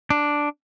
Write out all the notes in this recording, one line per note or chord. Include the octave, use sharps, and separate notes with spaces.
D4